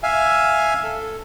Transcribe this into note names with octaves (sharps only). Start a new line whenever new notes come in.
E5 F5 G#5
A4